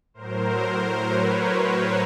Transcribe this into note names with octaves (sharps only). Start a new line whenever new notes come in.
A2 F#3 A#4 C5
B4 C#5